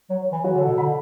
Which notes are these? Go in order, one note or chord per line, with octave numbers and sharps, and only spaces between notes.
F#3
E3
F#3 F#4
D3
A4
B2
D3 B5